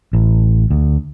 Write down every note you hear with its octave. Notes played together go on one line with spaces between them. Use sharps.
A1
D2